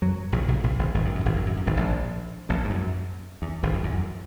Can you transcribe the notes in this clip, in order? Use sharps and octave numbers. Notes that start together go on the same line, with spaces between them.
F#2 F#3
A#1 A#2
B1 B2
A#1 A#2
G#1 G#2
G#1 G#2
F#2
F#2
G#1 G#2
F#2
F#2
F#2
G#1 G#2
A#1 A#2
A#1 A#2
G#2
F#2
E2
G#1 G#2
F#2
E2
F#2